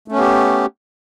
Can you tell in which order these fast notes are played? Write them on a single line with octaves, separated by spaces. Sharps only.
A3 C#4 B3 G4